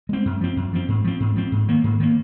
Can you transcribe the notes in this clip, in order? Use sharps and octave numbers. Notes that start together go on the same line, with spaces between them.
G#3 C4
F#2
F3 C4
F#2
F3 C4
G#2
F3 C4
G#2
F3 C4
G#2
D#3 A#3
G#2
D#3 A#3